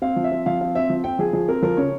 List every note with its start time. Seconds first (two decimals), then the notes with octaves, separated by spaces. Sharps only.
0.02 C4 F5
0.16 F3
0.24 E5
0.32 C4
0.46 F3 F5
0.61 C4 F5
0.75 C4 E5
0.90 F3
1.04 C4 G5
1.19 F3 G#4
1.33 F3 G#4
1.48 C4 A#4
1.62 F3 A#4
1.77 C#3 C#5